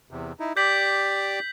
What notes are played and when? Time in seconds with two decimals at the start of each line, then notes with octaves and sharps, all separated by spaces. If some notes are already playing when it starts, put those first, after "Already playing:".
0.11 E2 C3
0.40 D#4 E4
0.57 G4 D5 D6 G6 B6 F#7